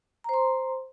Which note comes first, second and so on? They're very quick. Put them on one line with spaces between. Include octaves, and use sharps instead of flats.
A#5 C5 C6